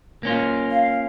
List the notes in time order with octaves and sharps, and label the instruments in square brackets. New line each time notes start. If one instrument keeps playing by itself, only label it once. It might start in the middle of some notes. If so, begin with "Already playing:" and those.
[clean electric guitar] A#3 C#4 F4
[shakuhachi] F5